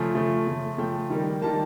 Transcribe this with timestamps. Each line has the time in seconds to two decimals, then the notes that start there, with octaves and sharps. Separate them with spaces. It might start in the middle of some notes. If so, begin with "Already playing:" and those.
Already playing: C#3 F3 A3 G#5
0.15 C#3 F3 A3
0.47 C#3 F3 A3
0.78 C#3 F3 A3 G5
1.10 D#3 G3 A#3
1.42 D#3 G3 A#3 A5